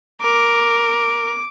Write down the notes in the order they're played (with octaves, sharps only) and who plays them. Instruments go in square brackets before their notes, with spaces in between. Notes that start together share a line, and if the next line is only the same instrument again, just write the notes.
[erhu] A#4 [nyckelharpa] D6